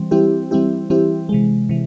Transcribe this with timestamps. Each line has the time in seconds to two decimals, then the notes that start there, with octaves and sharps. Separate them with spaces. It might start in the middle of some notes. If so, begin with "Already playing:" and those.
Already playing: E3 G3 C4
0.11 E3 G3 C4 E4 G4
0.51 E3 G3 C4 E4 G4
0.90 E3 G3 C4 E4 G4
1.29 C3 E3 G#3
1.69 C3 E3